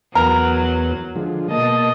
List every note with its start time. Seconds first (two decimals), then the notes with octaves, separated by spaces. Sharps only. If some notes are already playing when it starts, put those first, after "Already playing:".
0.15 E2 F#3 B3 A#4
1.16 D3 F3 G#3
1.51 B2 A#3 D#5 A5